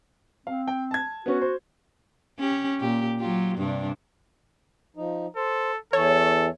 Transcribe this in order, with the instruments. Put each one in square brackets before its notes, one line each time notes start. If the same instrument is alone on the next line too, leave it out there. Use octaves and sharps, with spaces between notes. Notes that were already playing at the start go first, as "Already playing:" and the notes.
[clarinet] C4 [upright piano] F5
[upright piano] G5
A5 G#6
[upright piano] B3 C#4 [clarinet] F#4
[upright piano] C5
[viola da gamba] C#4 G4
A#2 G4
F#3 F4 G4
G2 C3 D4
[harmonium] F3 D#4
[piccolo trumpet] A4 [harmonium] C5
[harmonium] E2 E3 [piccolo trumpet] A4 [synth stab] C#5